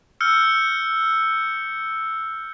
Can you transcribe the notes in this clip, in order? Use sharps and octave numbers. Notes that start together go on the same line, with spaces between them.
E6 F6 G6 C#7